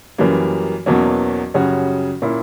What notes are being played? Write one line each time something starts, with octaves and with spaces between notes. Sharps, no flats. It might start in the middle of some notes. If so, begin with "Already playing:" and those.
F#2 E3 G3 A#3
E2 B2 F#3 A#3 C#4
F#2 C#3 G3 C#4 F#4
A#2 A#3 C#4 E4